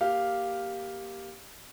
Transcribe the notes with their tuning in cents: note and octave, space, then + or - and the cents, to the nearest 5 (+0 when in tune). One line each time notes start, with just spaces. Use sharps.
A#3 +0 G4 +0 F5 +0